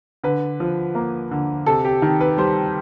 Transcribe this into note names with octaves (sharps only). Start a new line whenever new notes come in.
D3 B4
F3
A#3
D3
C3 A4
G4
D#3
B4
G3 C5